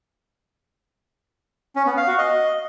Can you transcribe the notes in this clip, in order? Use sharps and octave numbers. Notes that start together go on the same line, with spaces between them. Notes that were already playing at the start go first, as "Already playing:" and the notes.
C#4
B3
F5
F#4
D#5